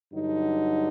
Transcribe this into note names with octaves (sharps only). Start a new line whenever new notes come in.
G2 D3 F#3 D#4